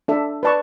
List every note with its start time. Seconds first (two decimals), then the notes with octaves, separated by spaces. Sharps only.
0.08 D4 A4 E5
0.43 B4 D5 A5 C#6